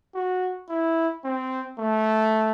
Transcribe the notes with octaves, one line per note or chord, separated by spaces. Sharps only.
F#4
E4
C4
A3